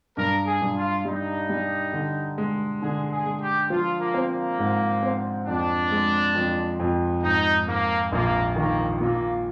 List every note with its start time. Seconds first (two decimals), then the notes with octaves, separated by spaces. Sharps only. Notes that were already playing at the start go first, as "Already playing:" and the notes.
0.17 G2 A#4
0.47 G#4
0.61 G2
0.76 F4
1.05 G3 D#4
1.49 G3
1.93 D3
2.38 G#3
2.82 D3 G#4
3.11 G#4
3.26 G#3
3.41 G4
3.70 F3 F4
3.99 A#3
4.14 C4
4.30 A#3
4.59 G#2
5.03 C4
5.47 F2 D4
5.92 G#3
6.35 F2
6.80 F2
7.23 G#2 D#4
7.68 G#2 A#3
8.12 A#1 A#3
8.56 D#3 A#3
9.00 A#2 A#3